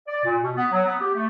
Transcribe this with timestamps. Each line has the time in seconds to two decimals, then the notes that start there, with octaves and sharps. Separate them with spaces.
0.07 D5
0.24 A#2
0.42 B2
0.55 B3
0.71 F#3
0.85 B3
1.00 G4
1.14 A3